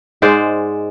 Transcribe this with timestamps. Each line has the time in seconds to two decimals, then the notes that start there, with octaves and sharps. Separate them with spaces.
0.22 G#2 G#3 C5 D5